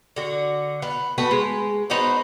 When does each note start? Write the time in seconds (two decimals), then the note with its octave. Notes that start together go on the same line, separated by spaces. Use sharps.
0.16 D3 F#4
0.82 B3 F#5
1.18 A3 B3 F#4 B4
1.31 G#3
1.90 B3 D#4 F#4 C5